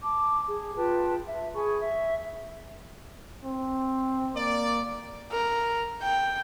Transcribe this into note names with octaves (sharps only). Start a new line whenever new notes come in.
A5 D6
G#4
F4 B4 G5 A5
E5
G#4 G#5 B5 C#6
E5
C4
A#3 D5
A#4
G5